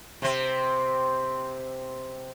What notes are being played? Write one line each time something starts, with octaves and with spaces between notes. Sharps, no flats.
C3 C4